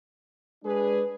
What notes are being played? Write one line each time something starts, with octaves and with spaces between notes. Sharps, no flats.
G#3 D4 G#4 B4